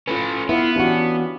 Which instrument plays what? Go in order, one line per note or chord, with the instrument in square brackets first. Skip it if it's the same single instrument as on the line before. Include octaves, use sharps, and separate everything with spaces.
[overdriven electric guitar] A3 C#4 [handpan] F4 B4
[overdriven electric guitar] B3 [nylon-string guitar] E4 [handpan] B4 F5
[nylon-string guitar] E3 C#4 F#4 [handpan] D4 G4